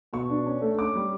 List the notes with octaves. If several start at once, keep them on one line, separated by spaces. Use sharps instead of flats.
B2 C#6
D4
C#4
A3
C#4 D6
G3